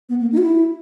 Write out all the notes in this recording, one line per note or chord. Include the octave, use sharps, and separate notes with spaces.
B3
A#3
D#4
F#4
E4